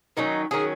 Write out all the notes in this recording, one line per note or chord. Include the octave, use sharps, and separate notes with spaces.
D#3 F#3 C#4 D#4
D#3 F#3 C#4 G#4